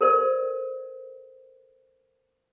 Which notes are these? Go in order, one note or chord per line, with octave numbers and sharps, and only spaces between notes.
A4 A#4 C5 D5